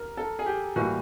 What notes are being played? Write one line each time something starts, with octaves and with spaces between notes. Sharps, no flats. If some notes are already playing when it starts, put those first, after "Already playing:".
Already playing: D#2 A#4
A4
G#4
G4
A2 E3 G3 A#3 F#4